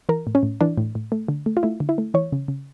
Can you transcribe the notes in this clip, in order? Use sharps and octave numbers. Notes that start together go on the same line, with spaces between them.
E3 A#4
A2
C#4
A2
E3 D4
A2
A2
A3
D3
A3
F4
A3 E4
D3
E4
A3
E3 C#5
C#3
C#3